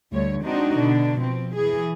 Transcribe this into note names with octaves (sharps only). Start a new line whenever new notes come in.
D2 D3 G3 C#5
G#3 C4 D4 D#4 F#4
B2 D3 D4
F3 C4
E3 G#4